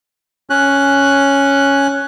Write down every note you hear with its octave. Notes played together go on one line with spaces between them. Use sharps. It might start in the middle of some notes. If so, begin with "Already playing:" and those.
C#4 F#6